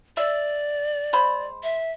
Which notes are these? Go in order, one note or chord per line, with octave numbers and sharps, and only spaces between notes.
D5 E5
G#3 C5 B5
E5